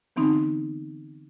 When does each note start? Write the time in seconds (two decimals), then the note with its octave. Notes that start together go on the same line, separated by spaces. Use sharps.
0.16 D3 E3 B3 C4 D#4